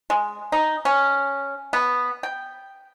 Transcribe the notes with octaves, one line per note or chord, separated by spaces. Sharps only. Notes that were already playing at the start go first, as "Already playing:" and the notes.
G#3
D#4
C#4
B3
G5